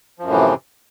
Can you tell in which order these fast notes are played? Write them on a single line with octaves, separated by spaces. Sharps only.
F3 F#2 A2 E3 C3